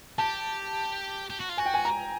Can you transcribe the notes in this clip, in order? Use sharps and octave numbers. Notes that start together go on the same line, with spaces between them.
G4 A5
G4
F#4
F4
F#4 G#5
G5
G#5
A#5